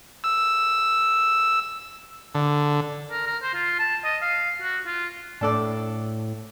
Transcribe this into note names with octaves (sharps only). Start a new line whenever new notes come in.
E6
D3
A#4
A#4
C5
F4
A5
D#5
F5
F#4
F4
A2 D4 A4 D5